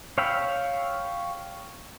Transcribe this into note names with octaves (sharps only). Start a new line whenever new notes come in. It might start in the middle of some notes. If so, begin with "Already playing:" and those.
C#5 F5 G5 B5 E6